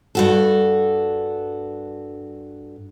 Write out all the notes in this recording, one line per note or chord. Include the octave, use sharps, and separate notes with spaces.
G2 F#4 A4